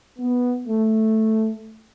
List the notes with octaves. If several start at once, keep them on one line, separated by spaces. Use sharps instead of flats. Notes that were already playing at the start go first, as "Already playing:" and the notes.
B3
A3